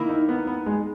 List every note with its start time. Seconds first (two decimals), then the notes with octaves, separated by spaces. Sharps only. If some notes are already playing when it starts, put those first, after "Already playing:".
Already playing: D#3 A#3 E4 A#4
0.09 D#4
0.29 B3
0.47 B3
0.66 G#3